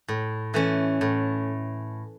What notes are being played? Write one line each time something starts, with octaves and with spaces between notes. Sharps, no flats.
A2
E3 A3 C#4
A2